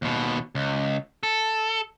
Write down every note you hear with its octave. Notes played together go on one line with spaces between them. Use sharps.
D#2 B2
C#2
A4